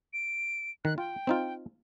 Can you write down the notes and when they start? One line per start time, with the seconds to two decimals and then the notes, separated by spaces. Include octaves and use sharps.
0.13 D7
0.85 D#3 F#6
0.98 F4 G5
1.27 C4 D#4 F4